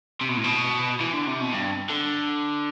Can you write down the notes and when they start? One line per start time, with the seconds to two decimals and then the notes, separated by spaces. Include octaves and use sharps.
0.21 C3
0.29 B2
0.37 A2
0.44 B2
1.00 E3
1.13 D3
1.27 C3
1.41 B2
1.53 G2
1.89 D3